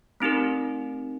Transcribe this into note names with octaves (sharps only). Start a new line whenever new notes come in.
A3 C4 D#4 G4 A#4